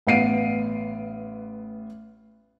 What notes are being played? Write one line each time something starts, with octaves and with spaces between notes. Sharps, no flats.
A1 B3 F5 C7 D7 D#7